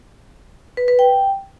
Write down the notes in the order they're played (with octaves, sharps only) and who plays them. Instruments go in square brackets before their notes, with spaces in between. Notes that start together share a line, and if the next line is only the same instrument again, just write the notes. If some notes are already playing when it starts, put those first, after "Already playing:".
[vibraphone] B4
B4
G5